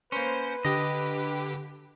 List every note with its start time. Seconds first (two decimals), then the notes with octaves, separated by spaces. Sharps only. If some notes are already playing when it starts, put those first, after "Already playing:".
0.12 A#3 C#4 B4 C5
0.65 D3 G4 D#5